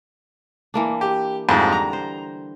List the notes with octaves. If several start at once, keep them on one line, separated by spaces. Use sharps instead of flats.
E3 A#3 D4
G4
F2 G#2 D3 E3 G3
A#5
C5